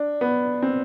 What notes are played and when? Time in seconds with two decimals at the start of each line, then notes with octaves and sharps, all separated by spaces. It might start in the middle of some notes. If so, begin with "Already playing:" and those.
Already playing: D4
0.21 B3
0.62 C4